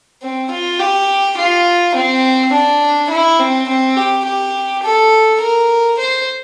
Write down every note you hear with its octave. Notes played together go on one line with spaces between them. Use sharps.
C4
F4
G4
F4
C4
D4
E4
C4
C4
G4
G4
A4
A#4
C5